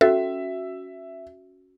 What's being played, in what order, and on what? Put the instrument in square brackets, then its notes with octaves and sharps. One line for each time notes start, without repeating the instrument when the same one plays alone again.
[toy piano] C#4 F#4 [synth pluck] A4 [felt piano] E5